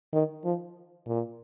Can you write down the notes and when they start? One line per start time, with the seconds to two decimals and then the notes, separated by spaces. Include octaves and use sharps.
0.13 D#3
0.44 F3
1.06 A#2